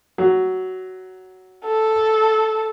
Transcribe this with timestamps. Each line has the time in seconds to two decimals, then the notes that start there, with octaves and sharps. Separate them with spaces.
0.18 F#3
1.64 A4